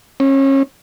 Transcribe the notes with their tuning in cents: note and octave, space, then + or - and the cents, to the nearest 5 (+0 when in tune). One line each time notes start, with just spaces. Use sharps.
C#4 -30